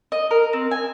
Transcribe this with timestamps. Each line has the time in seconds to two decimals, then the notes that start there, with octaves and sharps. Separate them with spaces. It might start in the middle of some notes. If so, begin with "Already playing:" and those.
0.12 D#5
0.31 A#4
0.53 C4
0.71 G#5